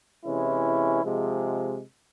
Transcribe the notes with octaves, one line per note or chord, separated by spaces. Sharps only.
C3 E3 G#3 C#4 E4
C3 F3 G#3